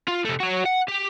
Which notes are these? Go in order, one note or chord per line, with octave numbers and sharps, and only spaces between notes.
F4
C3 A3
F#4 C#5
F#5
G4